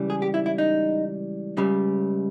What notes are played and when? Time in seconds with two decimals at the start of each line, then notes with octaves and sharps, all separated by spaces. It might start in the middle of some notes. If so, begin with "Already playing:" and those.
Already playing: C#2 C#3 E3 G3
0.10 G#4
0.22 G4
0.34 E4
0.46 E4
0.58 D#4
1.57 C#2 C#3 G3